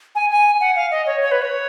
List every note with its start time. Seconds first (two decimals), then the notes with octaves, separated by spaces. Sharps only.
0.15 G#5
0.30 G#5
0.60 F#5
0.76 F5
0.91 D#5
1.06 C#5
1.21 C#5
1.31 B4
1.42 C#5